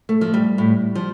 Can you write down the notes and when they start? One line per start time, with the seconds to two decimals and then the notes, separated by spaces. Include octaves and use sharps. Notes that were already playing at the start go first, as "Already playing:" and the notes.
0.09 A3
0.21 F3
0.34 G3
0.58 A2
0.95 F3